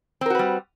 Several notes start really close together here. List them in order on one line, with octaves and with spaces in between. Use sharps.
C4 A#4 F#4 B4 G3